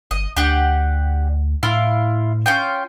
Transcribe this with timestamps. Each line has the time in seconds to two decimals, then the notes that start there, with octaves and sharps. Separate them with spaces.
0.11 G1 D#5
0.37 D2 D4 G4 F#5
1.63 A2 E4 F4 F5
2.46 C#4 F4 G5